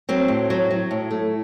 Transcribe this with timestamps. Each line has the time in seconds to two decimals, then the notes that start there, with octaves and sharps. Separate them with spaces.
0.09 F#3 C4
0.28 A2
0.50 F#3
0.71 F#3
0.91 A2
1.11 A3